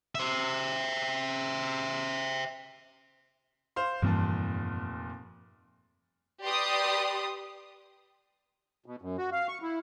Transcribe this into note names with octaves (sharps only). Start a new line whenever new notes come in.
C5 E5
C5 F5 C6
F1 G2 A#2 E3 G3 A5
G4 B4 D5 C6 D#6
B2
F#2
F#4
F5
C#6
E4